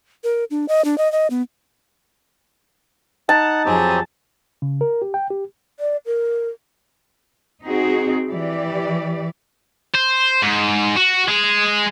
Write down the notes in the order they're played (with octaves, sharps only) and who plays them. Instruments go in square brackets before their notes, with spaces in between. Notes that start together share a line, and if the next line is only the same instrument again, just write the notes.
[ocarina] A#4
D4
D#5
D4
D#5
D#5
B3
[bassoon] D#4 [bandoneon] F#5 [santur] A5
[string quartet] F2 G#4 [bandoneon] F#3 C4 G4
[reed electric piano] C#3
A#4
G4
G5
G4
[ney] D5
A#4
[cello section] C4 D#4 F#4 G#4
E3 G4 D5
[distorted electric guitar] C5
G#2
F#4
G#3 G#4